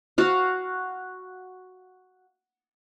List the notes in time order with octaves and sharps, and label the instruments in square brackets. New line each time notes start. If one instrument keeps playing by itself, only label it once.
[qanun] F#4 F5